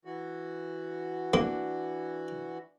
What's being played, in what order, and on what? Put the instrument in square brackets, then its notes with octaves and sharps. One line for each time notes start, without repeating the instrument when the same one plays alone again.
[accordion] E3 F#4
[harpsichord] A#3 [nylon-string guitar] D4